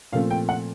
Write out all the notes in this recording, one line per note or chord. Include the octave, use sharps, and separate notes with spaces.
A#2 F3 A3 C4 F5
G5
F#5